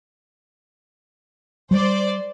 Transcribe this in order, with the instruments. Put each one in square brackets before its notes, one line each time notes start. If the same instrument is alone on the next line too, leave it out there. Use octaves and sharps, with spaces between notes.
[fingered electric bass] G3 [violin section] C5 D5